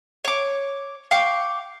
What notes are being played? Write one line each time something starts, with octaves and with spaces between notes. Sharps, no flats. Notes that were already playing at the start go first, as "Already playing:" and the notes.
C#5 D6
F5 G5 C#6 D6